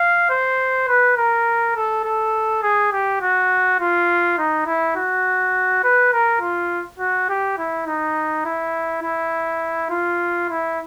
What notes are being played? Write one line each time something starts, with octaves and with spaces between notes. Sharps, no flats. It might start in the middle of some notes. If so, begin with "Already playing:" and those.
Already playing: F5
C5
B4
A#4
A4
A4
G#4
G4
F#4
F4
D#4
E4
F#4
B4
A#4
F4
F#4
G4
E4
D#4
E4
E4
F4
E4